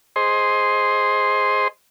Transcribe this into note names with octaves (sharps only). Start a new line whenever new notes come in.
G#4 C5 D#5 C6